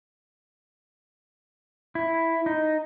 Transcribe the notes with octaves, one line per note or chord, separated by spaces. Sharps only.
E4
D#4